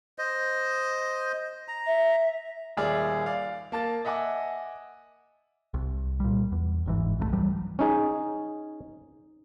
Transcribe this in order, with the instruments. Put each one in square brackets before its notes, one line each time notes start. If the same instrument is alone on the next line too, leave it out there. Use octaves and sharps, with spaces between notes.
[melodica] C5 D#5
A#5
[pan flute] E5
[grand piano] D#1 D#2 G#4 D5 E5 F6
D5 F5
A#3 A5 A6
D#5 E5 F#5 G#5 D6
[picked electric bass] C2
A#2 G3
E2
G1 G#2 E3
C2 A2 F3 A3
D#2 E3 F#3 G3
[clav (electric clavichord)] C#4 D#4 G#4